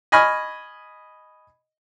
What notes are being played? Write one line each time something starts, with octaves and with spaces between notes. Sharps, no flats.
D#5 G#5 B5 C#6 F6